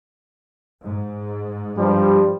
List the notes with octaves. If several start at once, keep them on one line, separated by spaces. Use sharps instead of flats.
G#2
G2 F3 G3